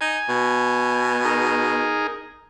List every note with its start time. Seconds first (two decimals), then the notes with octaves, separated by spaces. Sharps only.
0.01 D#4 G#5
0.29 B2
1.25 D#4 G#4 A#4